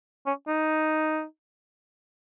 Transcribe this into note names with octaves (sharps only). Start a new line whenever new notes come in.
C#4
D#4